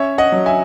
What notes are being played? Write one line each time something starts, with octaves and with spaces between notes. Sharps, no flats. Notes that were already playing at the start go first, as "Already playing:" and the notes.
Already playing: C#4 C#5 E5
D#5 F#5
F#3
E5 G#5